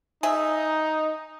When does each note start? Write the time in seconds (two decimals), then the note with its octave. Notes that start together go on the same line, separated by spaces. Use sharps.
0.23 D#4 G#4 E5